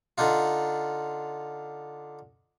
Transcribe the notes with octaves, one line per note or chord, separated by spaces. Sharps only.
D3 D4 D#4 F4